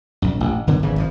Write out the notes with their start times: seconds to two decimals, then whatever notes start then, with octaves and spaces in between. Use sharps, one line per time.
0.22 A#1 F#2
0.40 A1
0.67 F#2 D3 E3 B3
0.82 G#1 C#3 E3
0.96 G#1 G2 F3